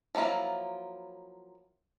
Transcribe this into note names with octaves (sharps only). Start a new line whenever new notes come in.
F3 F#3 A#3 E4 F4